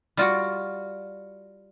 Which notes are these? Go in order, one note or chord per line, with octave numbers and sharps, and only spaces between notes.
G3 F4 F#4